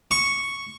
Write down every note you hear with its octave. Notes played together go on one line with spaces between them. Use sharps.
C#6